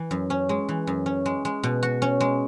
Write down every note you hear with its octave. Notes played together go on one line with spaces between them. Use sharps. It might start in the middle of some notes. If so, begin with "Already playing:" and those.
Already playing: E3
F#2
C#4
G#3
E3
F#2
C#4
G#3
G#3
B2
F#4
C#4
G#3